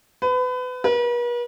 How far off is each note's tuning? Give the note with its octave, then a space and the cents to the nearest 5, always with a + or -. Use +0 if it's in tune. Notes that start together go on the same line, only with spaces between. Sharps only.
B4 +30
B4 -45